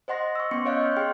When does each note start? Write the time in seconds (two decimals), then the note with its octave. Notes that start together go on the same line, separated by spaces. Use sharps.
0.08 C5 D#5 F#5 C6 A#6
0.35 C#6 E6
0.51 B3 C#4 C6 C#7
0.65 C#5 D#5 F5 C#6 F#6 G6
0.81 C6 F6 G6
0.97 G#4 G5 C6 F6